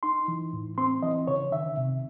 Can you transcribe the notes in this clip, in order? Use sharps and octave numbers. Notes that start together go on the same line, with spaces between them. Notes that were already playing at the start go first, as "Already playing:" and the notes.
D#4 C6
E3
A2
C4 C6
E3 D#5
C#3 C#5
D#3 E5
C3